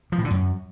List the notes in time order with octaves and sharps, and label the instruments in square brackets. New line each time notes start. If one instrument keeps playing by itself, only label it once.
[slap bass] F3
A2
D3
F#2